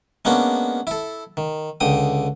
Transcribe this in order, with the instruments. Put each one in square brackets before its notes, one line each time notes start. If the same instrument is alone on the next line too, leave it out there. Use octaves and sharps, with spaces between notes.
[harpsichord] G#3 A#3 B3 C#4 D4
E4 A4
D#3
C#2 D3 G5 D#6